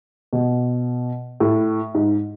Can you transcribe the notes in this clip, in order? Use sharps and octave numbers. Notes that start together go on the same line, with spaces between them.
B2
A2
G#2